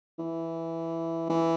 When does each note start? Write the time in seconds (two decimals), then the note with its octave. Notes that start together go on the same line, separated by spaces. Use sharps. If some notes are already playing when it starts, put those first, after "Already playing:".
0.19 E3
1.30 E3